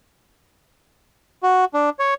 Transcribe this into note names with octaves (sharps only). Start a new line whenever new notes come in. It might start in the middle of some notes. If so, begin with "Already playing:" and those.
F#4
D4
C#5